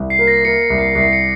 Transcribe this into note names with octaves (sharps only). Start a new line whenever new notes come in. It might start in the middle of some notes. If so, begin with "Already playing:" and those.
Already playing: C2
C7
A#3
A#6
A#3 C#7
C#7
C2
C7
C2 C7
C#7